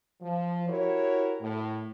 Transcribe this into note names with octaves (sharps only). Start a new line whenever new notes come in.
F3
E4 F#4 G4 A#4 C#5
A2